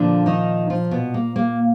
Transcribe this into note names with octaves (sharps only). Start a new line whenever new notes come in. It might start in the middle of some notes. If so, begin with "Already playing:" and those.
Already playing: A#2 D3 F3 D4
D#3 D#4
F3 F4
B2 B3
A#3
A#3